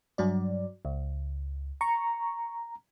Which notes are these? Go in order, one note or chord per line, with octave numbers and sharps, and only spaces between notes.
G2 F#3 D5
C#2
A#5 C#6